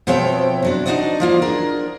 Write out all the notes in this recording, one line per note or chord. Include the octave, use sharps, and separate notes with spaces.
B2 F3 C4 C#5 E5 G5
C3 F#3 D4
D4 D#4 F4 F#4 D5 D#5
F3 A#3 F4
D4 G#4 A#4